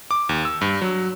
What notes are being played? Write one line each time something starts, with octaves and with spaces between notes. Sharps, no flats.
D6
D#2
E6
G2
F#3